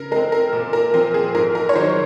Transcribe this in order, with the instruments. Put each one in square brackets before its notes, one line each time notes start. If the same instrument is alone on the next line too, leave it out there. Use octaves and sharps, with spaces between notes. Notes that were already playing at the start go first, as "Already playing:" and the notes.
Already playing: [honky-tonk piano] C#3 A#4
G#3 A#4
C4
A#4
A#2
A#4
F3 C4 A#4
G#4
G#2 A#4
A#4
C#5
D#3 F#3 C5